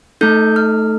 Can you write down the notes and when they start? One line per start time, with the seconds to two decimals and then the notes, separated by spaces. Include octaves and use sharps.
0.21 A3 D#4 A4 G6
0.56 F6